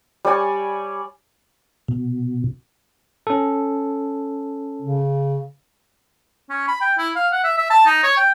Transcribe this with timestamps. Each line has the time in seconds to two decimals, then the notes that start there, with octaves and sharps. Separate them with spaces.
0.25 G3 C#5 D5 G#5
1.88 B2
3.27 C#4 A4
4.82 C#3
6.50 C#4
6.68 B5
6.81 G5
6.98 E4
7.16 F5
7.32 F#5
7.44 E5
7.58 E5
7.70 A5
7.86 D#4
8.03 C#5
8.17 G5